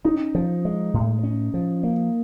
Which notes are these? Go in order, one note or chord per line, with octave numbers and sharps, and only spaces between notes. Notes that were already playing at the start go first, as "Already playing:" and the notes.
C#4 D#4
F3
G#3
A2
C#4
F3
A#3